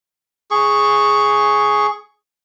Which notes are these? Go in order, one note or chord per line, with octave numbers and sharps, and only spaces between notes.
G#4 C#6